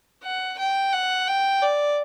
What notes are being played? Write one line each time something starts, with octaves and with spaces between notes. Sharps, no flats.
F#5
G5
F#5
G5
D5